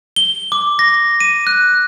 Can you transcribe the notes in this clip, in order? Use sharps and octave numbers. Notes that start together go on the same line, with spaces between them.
G7
D6
A#6
D#7
F#6